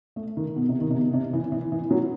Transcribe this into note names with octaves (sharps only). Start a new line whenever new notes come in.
A3
D#3
B2
C3
D#3
C3
B2
C3
E3
E3
E3
F#3